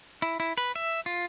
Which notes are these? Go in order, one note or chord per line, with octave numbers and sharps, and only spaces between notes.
E4
E4
B4
E5
F4